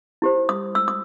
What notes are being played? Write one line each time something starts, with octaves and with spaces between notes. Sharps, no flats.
E4 G4 C5
D#6
E6
D#6